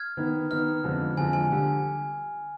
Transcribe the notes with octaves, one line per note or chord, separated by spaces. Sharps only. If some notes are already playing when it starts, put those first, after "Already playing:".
Already playing: F6 G#6
D#3 B3 D#4
D#3 B3 D#4 F6
F2 D3 F3 G#3
F2 D3 F3 G#3 G#5
G#5
D3 G3